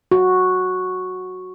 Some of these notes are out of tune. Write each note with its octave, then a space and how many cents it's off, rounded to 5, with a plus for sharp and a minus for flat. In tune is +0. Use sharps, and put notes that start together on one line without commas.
F#4 -5